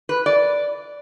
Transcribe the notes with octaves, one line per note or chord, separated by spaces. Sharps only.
B4
D5